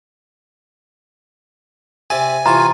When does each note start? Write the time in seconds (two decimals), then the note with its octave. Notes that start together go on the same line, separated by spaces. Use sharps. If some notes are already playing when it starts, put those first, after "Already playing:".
2.10 C3 D5 E5 G#5
2.46 C3 E3 F4 A#5 C#6